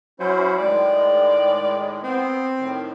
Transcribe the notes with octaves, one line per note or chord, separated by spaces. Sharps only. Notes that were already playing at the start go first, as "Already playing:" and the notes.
F#3 C#4 E4 C5
A2 D#3 G#3 D5
B3 C4
A2 D#3